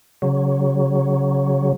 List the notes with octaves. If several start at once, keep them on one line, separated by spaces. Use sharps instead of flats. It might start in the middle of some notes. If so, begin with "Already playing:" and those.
C#3 F#3